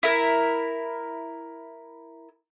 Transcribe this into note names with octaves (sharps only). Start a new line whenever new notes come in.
E4 A#4